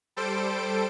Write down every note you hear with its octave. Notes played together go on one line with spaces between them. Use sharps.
G3 A4 C5 D7